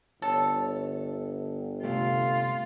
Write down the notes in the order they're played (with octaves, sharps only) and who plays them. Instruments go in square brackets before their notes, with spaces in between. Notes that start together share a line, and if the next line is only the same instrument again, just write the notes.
[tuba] G1 [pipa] A4 [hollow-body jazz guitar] C#5
[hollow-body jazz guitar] C3 A3 G4 [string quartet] F4